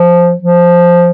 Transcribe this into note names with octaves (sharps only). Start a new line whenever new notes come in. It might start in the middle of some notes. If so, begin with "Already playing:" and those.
Already playing: F3
F3